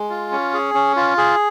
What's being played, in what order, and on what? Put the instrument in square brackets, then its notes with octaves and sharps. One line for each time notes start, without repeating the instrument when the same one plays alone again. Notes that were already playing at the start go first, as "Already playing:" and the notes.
Already playing: [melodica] G#3
F4
C#4
G#4
C#4
F4
G#4